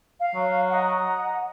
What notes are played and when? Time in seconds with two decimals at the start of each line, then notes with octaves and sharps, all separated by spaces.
0.19 F5
0.35 F#3
0.69 D#5 F#5 A#5